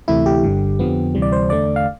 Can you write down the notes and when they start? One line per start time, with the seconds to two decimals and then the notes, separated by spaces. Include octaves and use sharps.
0.08 D2 C3 E3 A3 E4
0.26 G4
0.44 G1 G2 D3
0.79 F2 D3 F3 B3
1.15 D2 C3 E3 G3
1.22 D5
1.32 C5
1.50 E2 D3 A3 D5
1.76 F5